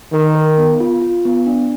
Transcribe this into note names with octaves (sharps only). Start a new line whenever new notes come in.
D#3 A#4
A#4
B3
F4
F4
B3
D4